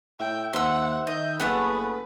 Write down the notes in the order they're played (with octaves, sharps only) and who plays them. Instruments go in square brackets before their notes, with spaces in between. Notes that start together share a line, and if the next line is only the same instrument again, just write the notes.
[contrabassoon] A2 [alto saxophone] E5 [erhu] G5
[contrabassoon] D#2 [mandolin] C5 E6 [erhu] F#5
[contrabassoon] D#3 [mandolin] D#5 [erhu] G6
[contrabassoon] F#1 [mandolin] A3 B3 F#5 [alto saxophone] G#4 [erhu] B4